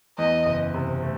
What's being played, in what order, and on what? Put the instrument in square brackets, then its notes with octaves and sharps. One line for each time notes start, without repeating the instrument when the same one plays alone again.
[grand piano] E2 [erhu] D#5
[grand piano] F#1
C3
A3